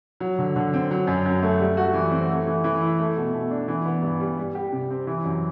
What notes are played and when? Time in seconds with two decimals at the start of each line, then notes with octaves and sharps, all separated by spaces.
0.20 F#3
0.39 D3
0.56 D3
0.74 C4
0.91 F#3
1.07 F#2
1.26 F#2
1.42 A3
1.60 G3
1.77 F#4
1.94 E3
2.11 C4
2.29 A3
2.47 E3
2.64 E3
2.81 E4
2.99 A3
3.16 B2
3.33 B2
3.51 D4
3.68 E3
3.85 B3
4.02 G2
4.20 G3
4.38 G3
4.55 G4
4.72 C3
4.90 C4
5.07 E3
5.25 F#2